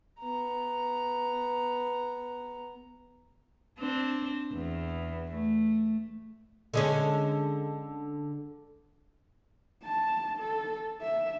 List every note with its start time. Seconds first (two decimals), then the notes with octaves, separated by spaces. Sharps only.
0.20 B3 A#5
3.79 C4 D4
4.53 E2
5.30 A3
6.74 D3 G#3 C#4
9.84 A5
10.38 A4
11.01 E5